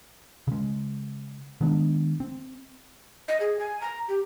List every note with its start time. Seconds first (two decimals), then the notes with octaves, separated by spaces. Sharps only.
0.47 C#3 G#3
1.61 D#3 G#3 B3 D4
2.20 C4
3.28 D#5
3.40 G#4
3.59 G#5
3.81 A#5
4.08 G4